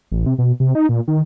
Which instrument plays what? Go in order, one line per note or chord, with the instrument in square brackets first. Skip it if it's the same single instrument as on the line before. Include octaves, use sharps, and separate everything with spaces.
[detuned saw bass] A1
C3
B2
C3
D#4
A#2
D#3